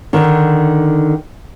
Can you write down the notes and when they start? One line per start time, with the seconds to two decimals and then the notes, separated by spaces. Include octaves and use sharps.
0.13 D3 D#3